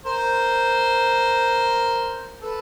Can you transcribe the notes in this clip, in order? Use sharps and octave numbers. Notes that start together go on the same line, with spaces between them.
A#4 C5
A4 B4